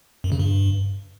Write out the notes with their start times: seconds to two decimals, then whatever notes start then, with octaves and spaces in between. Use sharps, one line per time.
0.24 F#2
0.32 C#3
0.39 G2